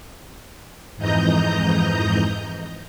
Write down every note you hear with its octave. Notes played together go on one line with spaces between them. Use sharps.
F2 G#2 E3 D#5 A#5 G6